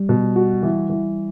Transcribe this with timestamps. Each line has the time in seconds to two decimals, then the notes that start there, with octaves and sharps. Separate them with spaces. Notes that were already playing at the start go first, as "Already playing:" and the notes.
Already playing: G3
0.09 B2
0.36 F#4
0.63 E3
0.90 E3